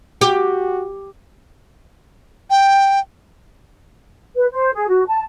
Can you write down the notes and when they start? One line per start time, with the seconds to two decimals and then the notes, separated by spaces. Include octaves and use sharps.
0.21 F#4 G4
2.50 G5
4.36 B4
4.51 C5
4.73 G#4
4.88 F#4
5.08 A5